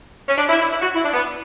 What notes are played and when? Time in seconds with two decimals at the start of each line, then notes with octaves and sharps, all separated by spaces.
0.28 C#4
0.38 D4
0.49 E4
0.60 E4
0.71 E4
0.81 F#4
0.93 E4
1.03 D4
1.14 B3